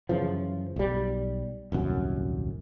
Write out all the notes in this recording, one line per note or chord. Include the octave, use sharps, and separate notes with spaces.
F#2 C#3 E3 F3
B1 G3
D#1 C2 F#2